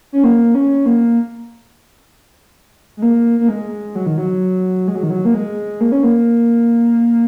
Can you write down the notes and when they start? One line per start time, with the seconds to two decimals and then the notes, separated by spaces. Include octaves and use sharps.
0.13 C#4
0.24 A#3
0.55 C#4
0.86 A#3
2.97 G#3
3.02 A#3
3.39 A#3
3.49 G#3
3.95 F#3
4.06 D#3
4.18 F#3
4.88 G#3
4.95 F#3
5.03 D#3
5.10 F#3
5.25 A#3
5.34 G#3
5.81 A#3
5.92 C#4
6.03 A#3